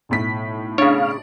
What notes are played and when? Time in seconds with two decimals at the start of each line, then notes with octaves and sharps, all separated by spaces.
0.09 B1 A2 B6
0.78 C#3 D4 C#5 F5